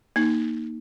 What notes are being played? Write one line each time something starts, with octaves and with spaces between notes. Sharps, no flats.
A#3 D#4